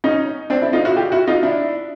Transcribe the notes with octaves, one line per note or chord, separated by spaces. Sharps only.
C#4 D#4
C4 D4
D4 E4
D#4 F4
E4 F#4
F4 G4
E4 F#4
D#4 F4
D4 E4